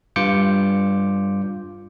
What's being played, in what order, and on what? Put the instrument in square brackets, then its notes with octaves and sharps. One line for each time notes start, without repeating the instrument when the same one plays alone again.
[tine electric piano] G2 F4 D6 G6 C#7